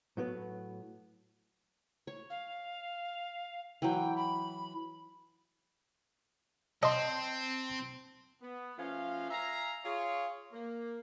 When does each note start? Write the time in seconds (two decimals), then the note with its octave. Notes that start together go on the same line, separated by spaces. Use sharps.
0.17 A2 F#3 B3
2.07 C#5
2.30 F5
3.82 E3 F#3 G5
4.17 B5
6.83 C4 D#5 A5 C6
8.41 B3
8.77 F3 A3 C#4 F4 F#4 F5
9.30 E5 F5 G#5 A#5
9.84 F4 G#4 C#5
10.52 A#3